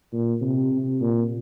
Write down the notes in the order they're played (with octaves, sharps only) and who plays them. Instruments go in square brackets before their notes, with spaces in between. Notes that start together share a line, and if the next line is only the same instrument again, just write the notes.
[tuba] A#2
C3
C3
A#2